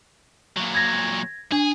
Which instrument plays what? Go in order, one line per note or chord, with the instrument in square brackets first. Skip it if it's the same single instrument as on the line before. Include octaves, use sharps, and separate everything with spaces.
[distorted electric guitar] A#2 F#3
[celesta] G#6 A#6
[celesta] D4 [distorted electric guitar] G#4